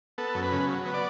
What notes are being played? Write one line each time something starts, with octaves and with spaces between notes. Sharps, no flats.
B3 A4
F#2
B4
C#3
F#3
B3
D5